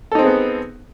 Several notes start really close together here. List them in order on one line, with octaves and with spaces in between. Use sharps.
A4 D#4 C4 G#4 B3